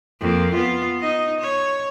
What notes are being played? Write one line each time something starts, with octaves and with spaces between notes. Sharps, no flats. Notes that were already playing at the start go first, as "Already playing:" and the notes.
F2 A#3
B3 F4
D#4 D#5
C#5